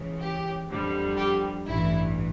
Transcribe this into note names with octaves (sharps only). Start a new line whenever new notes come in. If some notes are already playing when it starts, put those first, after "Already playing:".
Already playing: C#2 C#3 E3
G4
F2 D3 G3
G4
A1 G2 E3 E4